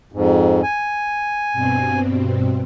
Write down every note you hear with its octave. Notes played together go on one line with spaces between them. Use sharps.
F2 G#2
G#5
G2 B2 C4